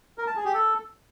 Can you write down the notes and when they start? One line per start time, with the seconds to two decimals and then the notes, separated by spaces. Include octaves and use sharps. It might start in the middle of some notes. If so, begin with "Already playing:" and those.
0.18 A#4
0.27 A5
0.36 G#4
0.45 G4
0.54 A4